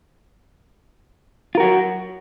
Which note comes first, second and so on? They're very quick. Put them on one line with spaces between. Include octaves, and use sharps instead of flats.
F4 A#4 F#4 F#3